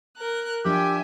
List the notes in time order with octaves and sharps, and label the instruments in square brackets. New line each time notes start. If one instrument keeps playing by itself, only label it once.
[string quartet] A#4 F#6
[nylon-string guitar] F3 D4 D5 [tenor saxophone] G4 [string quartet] E5 G5 G#5